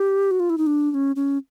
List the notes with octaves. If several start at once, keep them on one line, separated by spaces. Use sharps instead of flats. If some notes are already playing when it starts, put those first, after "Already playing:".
Already playing: G4
F#4
F4
E4
D#4
D4
D4
C#4
C#4